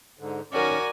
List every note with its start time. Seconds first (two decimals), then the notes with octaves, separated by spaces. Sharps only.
0.19 G#2 D3
0.52 D#3 C#4 F#4 A#4 D5 G#5